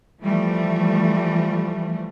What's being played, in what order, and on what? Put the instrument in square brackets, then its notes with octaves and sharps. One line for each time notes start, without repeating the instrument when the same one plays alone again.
[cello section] E3 F3 G3 A3